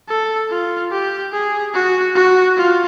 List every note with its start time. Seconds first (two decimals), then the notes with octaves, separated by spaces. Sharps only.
0.08 A4
0.50 F4
0.91 G4
1.32 G#4
1.74 F#4
2.15 F#4
2.57 F4